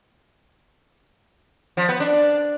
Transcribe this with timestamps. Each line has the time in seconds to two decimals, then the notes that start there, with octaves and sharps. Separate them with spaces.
1.77 F3
1.89 B3
2.00 D4